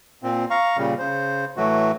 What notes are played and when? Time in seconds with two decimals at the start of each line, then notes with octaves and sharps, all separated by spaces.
0.23 A#2 C4
0.50 F5 A#5 C#6
0.77 A#2 C#3 G3
0.99 C#3 C5
1.57 A2 E3 F#3 A3 F#4